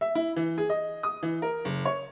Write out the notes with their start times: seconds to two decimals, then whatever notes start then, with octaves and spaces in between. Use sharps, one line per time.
0.01 E5
0.15 E4
0.36 E3
0.58 G#4
0.70 D#5
1.03 D#6
1.23 E3
1.42 A#4
1.65 F#1
1.85 C#5